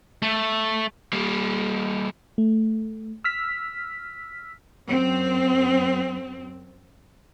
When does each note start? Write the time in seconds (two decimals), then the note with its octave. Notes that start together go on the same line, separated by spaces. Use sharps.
0.22 A3
1.13 G3 A#3
2.38 A3
3.24 E6 F6 B6
4.87 F#2 C4